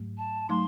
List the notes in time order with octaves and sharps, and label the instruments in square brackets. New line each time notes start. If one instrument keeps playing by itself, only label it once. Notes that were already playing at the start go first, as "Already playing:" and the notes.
Already playing: [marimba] G#2 F#3 A3
[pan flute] A5
[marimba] F#3 A3 D#4 [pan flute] C6